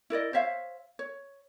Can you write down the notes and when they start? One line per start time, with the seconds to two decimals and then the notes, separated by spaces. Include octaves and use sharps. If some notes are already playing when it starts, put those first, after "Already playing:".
0.10 E4 A#4 D5 D#5
0.33 C5 C#5 E5 F5
0.99 C#5